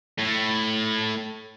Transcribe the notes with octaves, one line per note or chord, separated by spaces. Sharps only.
A2